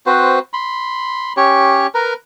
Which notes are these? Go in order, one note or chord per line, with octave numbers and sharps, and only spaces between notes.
C4 F#4 B4 C5
B5 C6
C#4 G4 C#5
A#4 B4 A#5